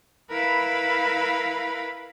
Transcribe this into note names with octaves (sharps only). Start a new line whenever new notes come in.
E4 A#4 B4 F5 B5